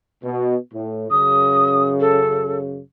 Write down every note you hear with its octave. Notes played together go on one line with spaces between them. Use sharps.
B2
A2
F#2 C#3 D#6
A4